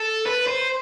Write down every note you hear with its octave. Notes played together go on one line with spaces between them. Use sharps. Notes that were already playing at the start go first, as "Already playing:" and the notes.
Already playing: A4
B4
C5